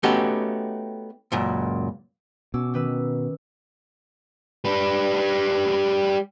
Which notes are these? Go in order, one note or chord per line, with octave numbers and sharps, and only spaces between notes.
A3 B3 C#4 D#4 F#4 G4
C#2 F#2 A#2
B2 C#4 D6 E6
D#3 B4 E6
G3 B4